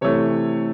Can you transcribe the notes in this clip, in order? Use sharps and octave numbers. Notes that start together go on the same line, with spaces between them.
C3 E3 A3 C#5